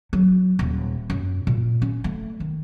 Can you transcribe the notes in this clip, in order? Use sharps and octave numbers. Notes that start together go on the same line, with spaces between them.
F#3
D#1
F#2
A#2
C#4
A3
D#3